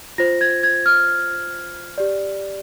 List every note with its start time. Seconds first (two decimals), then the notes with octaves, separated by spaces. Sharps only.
0.18 F4 C5 A#6
0.41 G#6
0.63 G#6
0.86 F6
1.98 G4 D5